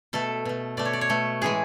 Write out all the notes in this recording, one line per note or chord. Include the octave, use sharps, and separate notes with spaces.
B2 A3 A4
B2 A3
B2 A3 D5
C#5
D5
C#5
B2 A3
A2 E3 G#3 G#4